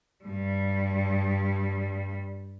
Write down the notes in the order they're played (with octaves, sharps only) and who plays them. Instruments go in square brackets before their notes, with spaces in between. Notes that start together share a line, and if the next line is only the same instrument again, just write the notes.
[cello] G2 G3